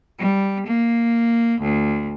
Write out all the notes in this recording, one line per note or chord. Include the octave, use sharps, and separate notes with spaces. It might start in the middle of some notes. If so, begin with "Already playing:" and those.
G3
A#3
D2